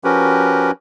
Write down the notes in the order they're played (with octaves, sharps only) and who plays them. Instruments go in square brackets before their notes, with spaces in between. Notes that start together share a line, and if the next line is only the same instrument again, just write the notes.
[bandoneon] F3 C#4 F#4 G4 A#4 B4